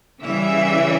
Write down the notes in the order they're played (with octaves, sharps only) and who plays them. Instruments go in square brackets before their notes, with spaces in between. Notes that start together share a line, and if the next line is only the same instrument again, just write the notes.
[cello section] C#3 E3 G3 E5